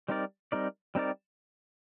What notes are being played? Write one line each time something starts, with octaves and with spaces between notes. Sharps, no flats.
G3 C4 D#4 A#4 D5
G3 C4 D#4 A#4 D5
G3 C4 D#4 A#4 D5